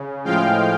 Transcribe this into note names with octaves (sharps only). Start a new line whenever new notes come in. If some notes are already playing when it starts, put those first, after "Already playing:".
Already playing: C#3
A2 F3 G#3 F5 G5